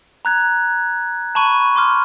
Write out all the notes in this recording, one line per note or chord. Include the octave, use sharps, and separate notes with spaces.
A#5 F#6 G#6
A5 B5 C#6 D#7
C6 D6 F6